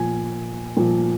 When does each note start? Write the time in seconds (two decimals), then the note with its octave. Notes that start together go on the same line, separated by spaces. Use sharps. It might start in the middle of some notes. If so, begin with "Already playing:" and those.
Already playing: A#2 F3 G#5
0.77 A#2 F3